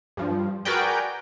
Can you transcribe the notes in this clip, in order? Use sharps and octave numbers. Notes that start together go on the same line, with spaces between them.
G2 F3
F#4 G#4 A#4 B4 D5 G5